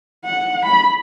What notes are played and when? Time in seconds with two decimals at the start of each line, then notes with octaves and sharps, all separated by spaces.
0.24 F#5
0.65 B5